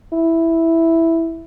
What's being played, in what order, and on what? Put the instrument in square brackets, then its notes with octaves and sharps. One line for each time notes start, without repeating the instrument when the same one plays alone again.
[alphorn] E4